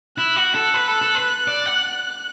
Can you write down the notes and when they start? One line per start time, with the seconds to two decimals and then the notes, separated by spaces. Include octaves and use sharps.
0.17 E4 F#6
0.36 F#4
0.55 A4
0.74 B4
0.88 A4
1.02 A4
1.15 B4
1.48 D5
1.66 F#5